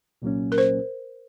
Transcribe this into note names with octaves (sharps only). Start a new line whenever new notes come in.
C2 A#2 F#3 A#3 C#4
A#4
C5